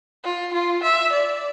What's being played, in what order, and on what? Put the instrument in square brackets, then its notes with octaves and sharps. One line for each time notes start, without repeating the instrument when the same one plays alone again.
[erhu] F4
F4
E5
D5